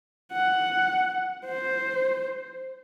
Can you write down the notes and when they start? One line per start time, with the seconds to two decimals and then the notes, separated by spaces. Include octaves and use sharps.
0.32 F#5
1.46 C5